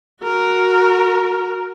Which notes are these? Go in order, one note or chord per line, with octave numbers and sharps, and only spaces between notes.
F#4 A#4